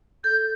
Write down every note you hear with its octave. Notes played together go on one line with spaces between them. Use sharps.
A4 G6